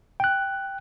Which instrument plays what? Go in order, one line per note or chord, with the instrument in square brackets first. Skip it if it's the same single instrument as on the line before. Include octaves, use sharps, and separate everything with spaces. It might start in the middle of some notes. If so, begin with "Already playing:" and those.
[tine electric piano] G5 F#6